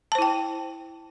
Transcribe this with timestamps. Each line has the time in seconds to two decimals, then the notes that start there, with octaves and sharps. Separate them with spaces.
0.12 A5
0.15 C5
0.19 E4
0.22 G5